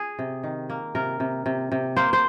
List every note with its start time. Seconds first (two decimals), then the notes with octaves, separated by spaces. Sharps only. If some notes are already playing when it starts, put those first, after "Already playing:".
Already playing: G#4
0.19 C3
0.44 D#3
0.70 A#3
0.95 C3 A#4
1.20 C3
1.46 C3
1.72 C3
1.97 A#3 C5
2.13 C5